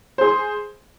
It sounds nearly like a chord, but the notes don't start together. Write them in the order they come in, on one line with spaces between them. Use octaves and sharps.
C5 G#4 C6